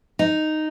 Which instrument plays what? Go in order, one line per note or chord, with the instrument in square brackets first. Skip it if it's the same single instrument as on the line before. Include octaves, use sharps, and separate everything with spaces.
[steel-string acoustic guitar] D#4